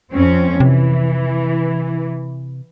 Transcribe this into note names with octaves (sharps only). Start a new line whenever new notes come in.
F2 C4 C#4
C3 E3